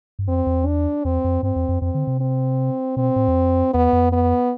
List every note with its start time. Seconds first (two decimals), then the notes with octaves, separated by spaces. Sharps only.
0.19 G2
0.28 F2 C4
0.47 E2
0.66 D4
1.04 E2 C4
1.24 F2
1.43 G2 C4
1.56 E2
1.69 F2
1.81 F2 C4
1.95 D3
2.07 C3
2.20 C4
2.97 B2 C4
3.16 A2
3.28 E2
3.36 F2
3.74 E2 B3
3.93 F2
4.12 B3